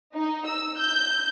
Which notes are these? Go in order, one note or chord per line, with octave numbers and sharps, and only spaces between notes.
D#4
E6
G6